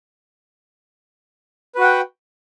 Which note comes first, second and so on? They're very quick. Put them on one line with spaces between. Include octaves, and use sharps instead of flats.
B4 F#4 F#5 G5